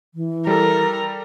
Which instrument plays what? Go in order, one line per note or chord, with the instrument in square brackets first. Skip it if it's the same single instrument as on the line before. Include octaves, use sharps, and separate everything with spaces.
[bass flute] E3
[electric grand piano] G3 A4 [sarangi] A#4